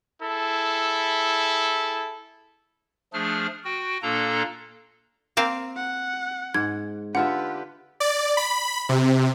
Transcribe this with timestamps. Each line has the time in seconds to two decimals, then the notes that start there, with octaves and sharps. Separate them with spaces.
0.21 E4 G#4 A4
3.13 F3 A3 D4 G#4 F6
3.65 F#4 G5
4.03 A#2 A#3 D4 A4 A#5
5.37 A#3 C4 F5
5.76 F#5
6.54 G#2 G#6
7.15 D3 F4 G4 B4 E5 F#5
8.00 D5
8.37 B5
8.89 C3